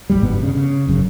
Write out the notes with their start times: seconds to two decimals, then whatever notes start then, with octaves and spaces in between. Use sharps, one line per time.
0.10 E1 A1 D#2 G3
0.23 F#1 G2 B2 B3
0.41 C#3
0.55 C#3
0.87 G1 F#2 C#3